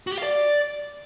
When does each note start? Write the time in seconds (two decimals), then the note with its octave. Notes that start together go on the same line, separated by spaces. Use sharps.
0.07 F#4
0.12 G4
0.18 F5
0.23 D5